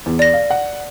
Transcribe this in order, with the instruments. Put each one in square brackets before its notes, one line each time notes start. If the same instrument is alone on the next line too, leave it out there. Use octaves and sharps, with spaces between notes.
[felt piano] E2
[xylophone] D5 A#6
[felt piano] F5
F#5